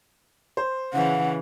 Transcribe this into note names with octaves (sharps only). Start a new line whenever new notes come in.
C5
C#3 E3 F#5